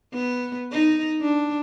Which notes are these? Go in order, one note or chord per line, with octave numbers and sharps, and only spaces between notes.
B3
D#4
D4